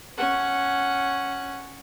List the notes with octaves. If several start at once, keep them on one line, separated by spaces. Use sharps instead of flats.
C#4 F#5